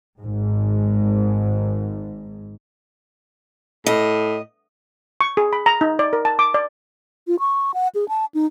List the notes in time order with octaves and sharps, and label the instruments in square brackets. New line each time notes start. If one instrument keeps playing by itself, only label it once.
[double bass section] G#1 G#2
[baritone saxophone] A2 [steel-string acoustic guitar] D#5
[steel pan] C#6
G#4
B5
A#5
D#4
D5
A#4
A5
D6
D5
[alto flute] F4
C#6
F#5
G#4
A5
D#4